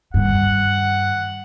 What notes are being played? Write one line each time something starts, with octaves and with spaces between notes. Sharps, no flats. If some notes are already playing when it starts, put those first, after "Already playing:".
G2 D#3 F#5